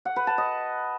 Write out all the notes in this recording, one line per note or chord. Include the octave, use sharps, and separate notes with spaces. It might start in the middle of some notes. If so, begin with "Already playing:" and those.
F#5
B4
A5
D#5